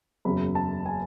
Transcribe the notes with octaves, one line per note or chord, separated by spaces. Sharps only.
F#1 E2 C#3 F#3 B5
A5
G#5